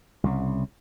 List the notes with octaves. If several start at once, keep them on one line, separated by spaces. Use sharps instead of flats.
C2 C#3